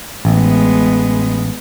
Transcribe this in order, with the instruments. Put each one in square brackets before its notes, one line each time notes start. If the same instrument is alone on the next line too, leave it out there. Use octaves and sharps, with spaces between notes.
[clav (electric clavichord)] A1 [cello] G#3 B3